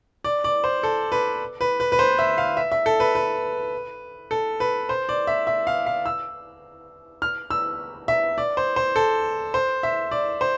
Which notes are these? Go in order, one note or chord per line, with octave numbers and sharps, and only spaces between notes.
D5
D5
C5
A4
B4
B4
B4
B4
C5
E5
F5
E5
E5
A4
B4
B4
A4
B4
C5
D5
E5
E5
F5
F5
E6
F6
E6
E5
D5
C5
C5
A4
C5
E5
D5
C5